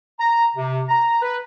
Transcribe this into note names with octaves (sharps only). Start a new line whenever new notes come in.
A#5
C3
A#5
B4